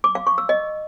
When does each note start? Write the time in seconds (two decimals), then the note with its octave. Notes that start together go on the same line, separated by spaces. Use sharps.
0.04 D6
0.15 F5
0.27 C#6
0.38 E6
0.49 D#5